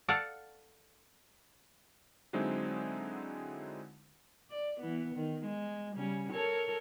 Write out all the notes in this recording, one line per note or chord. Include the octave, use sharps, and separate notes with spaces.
A4 D5 F5 F#5
D3 F#3 G#3 C4 D#4 E4
D5
E3 B3
D#3
G#3
C#3 G3 C#4
A4 A#4 C#5